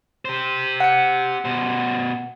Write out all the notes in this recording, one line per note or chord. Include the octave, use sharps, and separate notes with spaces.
G4 C5
F#5 C#7
B2 C5